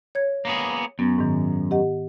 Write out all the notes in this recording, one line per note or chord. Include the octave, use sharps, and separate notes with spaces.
C#5 G#6
A#3 B3 G#4
F#2 B3
G#2 D#3
G4 D#5 F#5